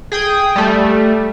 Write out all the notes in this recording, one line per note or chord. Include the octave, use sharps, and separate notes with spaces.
G#4 G5 D#6
G3 A3